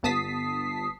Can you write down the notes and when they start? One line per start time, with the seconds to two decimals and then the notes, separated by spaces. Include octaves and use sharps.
0.03 G1 B3 A5 D#6 B6 C7